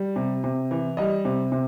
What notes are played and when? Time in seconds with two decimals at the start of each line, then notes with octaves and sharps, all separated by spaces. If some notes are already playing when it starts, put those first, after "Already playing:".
Already playing: G3
0.16 C3
0.44 C3
0.71 E3
0.97 G3 D#5
1.25 C3
1.52 C3